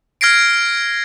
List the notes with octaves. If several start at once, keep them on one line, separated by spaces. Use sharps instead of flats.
F6 G#6 A#6 C7 D7